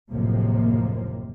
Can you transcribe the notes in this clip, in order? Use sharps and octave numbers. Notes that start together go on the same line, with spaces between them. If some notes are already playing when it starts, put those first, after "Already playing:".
F#1 D#2 A2 C3 F3 A#3